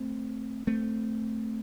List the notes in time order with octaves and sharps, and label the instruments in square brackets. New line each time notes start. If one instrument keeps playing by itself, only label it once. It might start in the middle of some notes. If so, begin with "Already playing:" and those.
Already playing: [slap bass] A3 C4
A3 C4